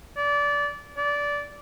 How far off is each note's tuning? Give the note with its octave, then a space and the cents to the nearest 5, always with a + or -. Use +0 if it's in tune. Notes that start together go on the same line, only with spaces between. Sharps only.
D5 -20
D5 -15